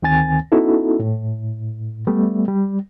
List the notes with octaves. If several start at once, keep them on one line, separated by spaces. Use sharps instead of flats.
D2 D#3 C4 G#5 A6
B3 C#4 D#4 E4 F#4 A4
A2
G3 A3 B3
G3